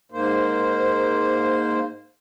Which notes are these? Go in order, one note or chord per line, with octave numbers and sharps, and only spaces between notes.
G#2 A#3 C5